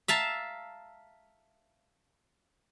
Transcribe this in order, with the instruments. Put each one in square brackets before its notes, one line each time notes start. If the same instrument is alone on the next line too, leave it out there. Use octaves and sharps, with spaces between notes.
[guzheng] E5 F5 A5 A#5